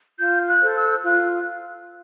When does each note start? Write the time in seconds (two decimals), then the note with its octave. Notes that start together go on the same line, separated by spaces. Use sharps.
0.18 F4 G6
0.47 F#6
0.61 A4 C5
0.76 E6
1.04 F4 F#6